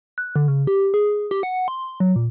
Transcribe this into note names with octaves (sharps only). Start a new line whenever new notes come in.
F#6
D3
C#3
G4
G#4
G4
F#5
C6
F#3
A#2